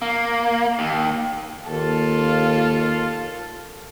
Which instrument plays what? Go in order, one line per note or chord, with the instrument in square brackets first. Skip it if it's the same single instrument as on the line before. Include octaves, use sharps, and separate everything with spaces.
[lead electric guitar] A#3
D#2
[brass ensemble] D#2 F4 [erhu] A4